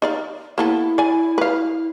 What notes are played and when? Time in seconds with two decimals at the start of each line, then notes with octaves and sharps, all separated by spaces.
0.02 D#4 D5 F5
0.58 A#3 B3 E4 A4
0.98 D5 G#5
1.38 B4 F5